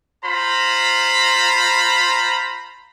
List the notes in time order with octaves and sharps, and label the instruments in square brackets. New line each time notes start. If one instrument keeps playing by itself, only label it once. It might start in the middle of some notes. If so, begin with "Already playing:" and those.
[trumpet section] F4 C5 A#5 B5